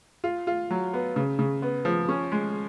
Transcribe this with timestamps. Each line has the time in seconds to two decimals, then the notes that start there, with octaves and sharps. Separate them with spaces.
0.24 F4
0.47 F4
0.71 F#3
0.94 B3
1.16 C#3
1.39 C#3
1.62 B3
1.85 F3
2.09 C#4
2.32 G#3